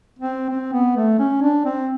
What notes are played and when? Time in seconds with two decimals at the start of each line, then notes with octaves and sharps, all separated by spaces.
0.19 C4
0.49 C4
0.73 B3
0.96 A3
1.19 C#4
1.42 D4
1.65 C4